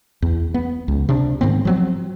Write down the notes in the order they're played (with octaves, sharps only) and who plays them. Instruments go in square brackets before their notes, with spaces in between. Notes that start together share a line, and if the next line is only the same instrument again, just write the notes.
[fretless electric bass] E2
B3
C#2
C3 D4
G#2 D#3 B3 C4
F3 F#3 C4